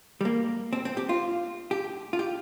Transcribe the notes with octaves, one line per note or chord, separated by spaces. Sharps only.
G3
A#3
C4
C4
G4
F4
G4
F4
G4